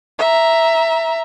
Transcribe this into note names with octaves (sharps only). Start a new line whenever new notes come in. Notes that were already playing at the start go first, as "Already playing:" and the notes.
E5 A#5